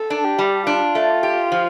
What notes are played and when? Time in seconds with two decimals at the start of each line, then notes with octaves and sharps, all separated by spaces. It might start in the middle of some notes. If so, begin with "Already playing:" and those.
Already playing: A4
0.10 D4
0.24 G4
0.39 G3
0.67 D4 F4
0.95 A3
1.23 G4
1.52 F3